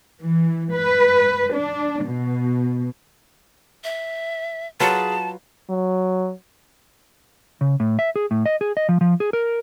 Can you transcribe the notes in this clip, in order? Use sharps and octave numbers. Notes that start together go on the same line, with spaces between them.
E3
B4
D4
B2
E5
F#3 F4 G#4 B4 A5
F#3
C#3
A2
E5
G#4
A2
D#5
G#4
D#5
F3
F3
G#4
A#4